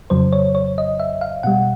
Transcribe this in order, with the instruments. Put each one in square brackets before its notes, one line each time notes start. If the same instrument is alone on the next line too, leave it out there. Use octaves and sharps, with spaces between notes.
[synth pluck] F2 C#3 F#3 C5
C#5
C#5
D#5
E5
F5
B2 G3 F#5